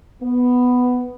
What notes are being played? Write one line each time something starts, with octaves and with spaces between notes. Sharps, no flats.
B3